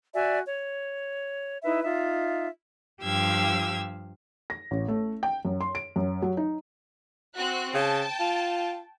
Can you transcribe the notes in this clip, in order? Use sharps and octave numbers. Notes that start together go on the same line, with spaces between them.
F#4 D5 E5 G#5
C#5
D#4 E4 B4 E5
D#4 F4 E5
G2 F3 G4 F5 E6 G#6
A#6
A1
A3
G5
F#2
C6
D7
F#2
F#3
D#4
C4 F#4 F#6
C#3 G5 A5
F4